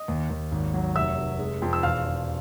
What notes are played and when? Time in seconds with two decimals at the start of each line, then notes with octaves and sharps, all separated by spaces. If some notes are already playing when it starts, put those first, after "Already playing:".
Already playing: D#5 D#6
0.08 D#2
0.30 D#2
0.52 G#1
0.74 F#3
0.96 F1 E5 E6
1.18 F1
1.39 G#3
1.62 F2
1.73 E6
1.83 E1 F5 F6
2.06 E1